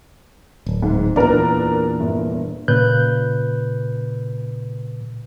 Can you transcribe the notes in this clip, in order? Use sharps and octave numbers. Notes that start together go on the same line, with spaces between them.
D1
G#2
E2 A#2 D4 A#4 B4
G1
A#2 C#3 B4 F#6 G6